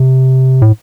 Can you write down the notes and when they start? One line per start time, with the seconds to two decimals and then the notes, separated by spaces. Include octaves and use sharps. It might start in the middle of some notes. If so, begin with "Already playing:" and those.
Already playing: C3
0.62 A2